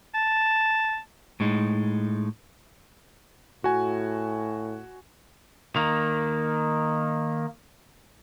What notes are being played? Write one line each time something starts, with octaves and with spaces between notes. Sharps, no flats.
A5
A2 G#3 D#4
A2 F#4 G#5
D#3 A#3